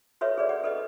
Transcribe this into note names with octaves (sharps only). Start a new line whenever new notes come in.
F#4 A4 B4 C#5 E5
G#4 B4 D5
F#5
A4 B4 D#5